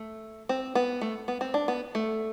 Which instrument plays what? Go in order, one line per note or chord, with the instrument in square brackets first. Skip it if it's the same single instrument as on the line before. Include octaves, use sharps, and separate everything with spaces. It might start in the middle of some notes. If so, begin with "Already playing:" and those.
Already playing: [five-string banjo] A3
C4
B3
A3
B3
C4
D4
B3
A3